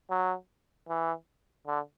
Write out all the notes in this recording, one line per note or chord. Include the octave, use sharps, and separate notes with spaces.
F#3
E3
D3